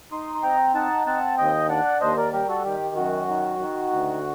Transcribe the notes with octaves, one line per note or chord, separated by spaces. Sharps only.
D#4 C6 D#6
C6
C4 G5 A#5
D#4 F#5 A5
C4 F#5 A5
D#2 D#5 G5
D4 D5 F#5
D#2 C5 D#5
A#4 D5
G3 G4 A#4
F#4 A4
D#3 G4
F#2 F#4
D#3
D#3
D2